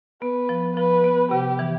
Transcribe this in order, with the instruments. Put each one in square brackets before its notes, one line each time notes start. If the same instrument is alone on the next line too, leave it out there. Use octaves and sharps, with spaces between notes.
[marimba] B3 [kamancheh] B4
[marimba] F3
[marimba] F3 [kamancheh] B4
[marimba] B3
[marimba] C3 [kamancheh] G4
[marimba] E3